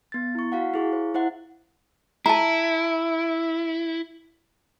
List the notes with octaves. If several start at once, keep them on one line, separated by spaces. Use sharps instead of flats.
B3 A6
E4 C#6
F#4 F5 F#5
E4 G#4 F5 C#6
C5
E4 C5 E5 F#5
E4 A5 A#5